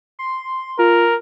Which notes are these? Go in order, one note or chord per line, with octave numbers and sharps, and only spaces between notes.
C6
F4 A#4